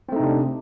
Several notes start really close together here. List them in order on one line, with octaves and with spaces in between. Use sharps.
C4 A3 D#4 C3 D4